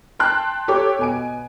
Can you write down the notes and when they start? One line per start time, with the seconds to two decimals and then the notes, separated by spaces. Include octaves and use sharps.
0.20 G5 A5 C6 F#6
0.68 G4 A4 C#5 D6
0.99 B2 G#5 D7